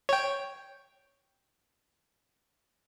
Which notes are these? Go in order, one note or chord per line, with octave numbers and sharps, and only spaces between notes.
C#5 G5